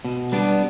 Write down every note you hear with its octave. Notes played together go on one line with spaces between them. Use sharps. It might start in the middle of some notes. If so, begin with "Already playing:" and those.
B2
G3 B3 D4